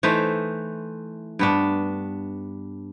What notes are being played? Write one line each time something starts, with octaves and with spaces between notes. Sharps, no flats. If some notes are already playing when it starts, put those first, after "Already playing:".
E3 A3 D#4 C5
G2 B3 D4